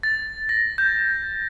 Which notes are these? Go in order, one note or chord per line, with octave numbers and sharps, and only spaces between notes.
A6
A#6
G6